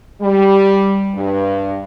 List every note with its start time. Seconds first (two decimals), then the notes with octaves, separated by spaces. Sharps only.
0.21 G3
1.15 G2